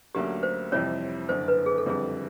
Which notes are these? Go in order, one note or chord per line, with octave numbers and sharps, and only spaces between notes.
D2 D3 F#3 A#3 C#4 G4
C5
F2 C3 E3 G3 C4 C#5
F#1 F#2 D3 C5
B4
G#4
A4
F#1 F2 D3 G3 C4 G#4